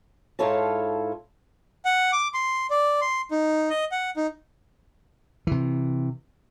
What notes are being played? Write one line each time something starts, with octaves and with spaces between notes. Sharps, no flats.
G#2 E4 F4 A4 C#5 A5
F#5
D6
C6
D5
C6
D#4
D#5
F#5
D#4
C3 E3